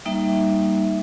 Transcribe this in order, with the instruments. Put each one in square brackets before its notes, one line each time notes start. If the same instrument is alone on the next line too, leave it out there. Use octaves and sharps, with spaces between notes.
[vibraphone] G3 A#3 D#4 E5